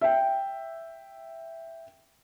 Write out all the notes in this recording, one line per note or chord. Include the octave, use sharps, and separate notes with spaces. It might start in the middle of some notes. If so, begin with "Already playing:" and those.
E5 G5